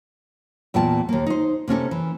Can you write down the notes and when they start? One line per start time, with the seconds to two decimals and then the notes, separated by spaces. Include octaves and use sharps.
0.74 E2 A#2 B3 G5 A5
1.09 D#2 A#3
1.26 D#4 C5
1.68 C3 A#3 C#4 A4
1.91 E3